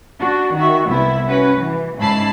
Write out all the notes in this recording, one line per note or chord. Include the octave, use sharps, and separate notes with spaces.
D4 F#4
D#3 F#4 E5
C2 B3 E4 E5
C#4 F#4 B4
E3
G#2 C#3 E4 A5 B5 C7